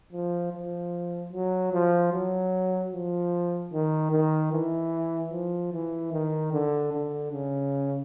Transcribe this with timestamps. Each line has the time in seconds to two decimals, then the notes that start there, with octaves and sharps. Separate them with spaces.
0.13 F3
0.53 F3
1.33 F#3
1.73 F3
2.13 F#3
2.93 F3
3.73 D#3
4.12 D#3
4.52 E3
5.32 F3
5.73 E3
6.12 D#3
6.52 D3
6.93 D3
7.32 C#3